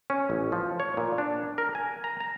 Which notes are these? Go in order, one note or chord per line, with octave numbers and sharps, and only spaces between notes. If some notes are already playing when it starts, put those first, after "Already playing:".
C#4
A1
F3
C#5
A#2
D4
A#4
G#5
A#5
A#5